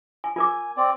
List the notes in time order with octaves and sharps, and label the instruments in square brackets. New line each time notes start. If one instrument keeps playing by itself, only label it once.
[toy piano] G#5
[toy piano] F4 A#4 D6 [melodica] G#5
[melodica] C4 D5